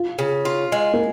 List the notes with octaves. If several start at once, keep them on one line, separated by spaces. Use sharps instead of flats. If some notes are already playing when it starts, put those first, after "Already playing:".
Already playing: F4
C#3
F4
G#3
A#3